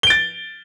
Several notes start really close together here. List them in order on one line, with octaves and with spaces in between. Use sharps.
G7 D7 A6